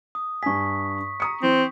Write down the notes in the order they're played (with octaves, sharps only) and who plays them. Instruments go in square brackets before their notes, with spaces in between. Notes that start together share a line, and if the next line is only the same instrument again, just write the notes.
[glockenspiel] D#6
[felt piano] G2 G#5 [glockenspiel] C#6 B6
[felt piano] A#5 D#6 C#7
[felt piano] E3 [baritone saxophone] C4